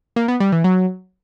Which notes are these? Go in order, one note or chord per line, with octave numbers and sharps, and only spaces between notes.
A#3
B3
G3
E3
F#3